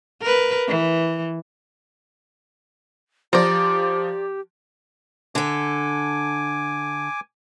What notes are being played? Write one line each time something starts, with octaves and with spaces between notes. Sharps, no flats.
A#4 B4
E3
F3 G4 D5 A#5
D3 A4 G#5 D6